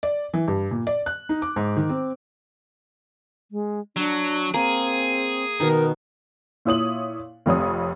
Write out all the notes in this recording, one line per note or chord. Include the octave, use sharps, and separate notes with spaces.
D5
E3
G2
A#2
D5
F#6
D#4
D6
G#2
D#3
C4
G#3
F#3 D4
A#3 C4 G#4
B2 D#3 D#4 A#4
A#2 E4 C#5 D#6 F#7
F1 F2 C#5 D#6